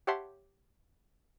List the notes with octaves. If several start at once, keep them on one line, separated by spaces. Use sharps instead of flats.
G4 C#5 E5 F#5 A5 C6